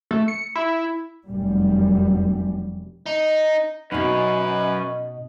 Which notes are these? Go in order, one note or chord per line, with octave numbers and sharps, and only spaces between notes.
A3
C#7
E4
F1 F#2 G3
D#4
F#2 B2 C#4 D#4 B4